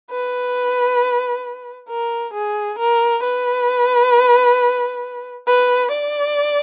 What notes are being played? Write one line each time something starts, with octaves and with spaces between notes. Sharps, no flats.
B4
A#4
G#4
A#4
B4
B4
D5